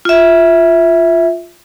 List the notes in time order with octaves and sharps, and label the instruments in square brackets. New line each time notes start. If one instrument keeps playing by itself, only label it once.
[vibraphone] F4 E5